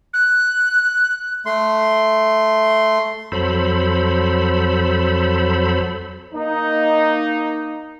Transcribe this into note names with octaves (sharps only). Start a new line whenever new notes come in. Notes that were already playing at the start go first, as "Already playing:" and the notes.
F#6
A3 C6
F2 F#3 A4 C5 B5
A#3 D#4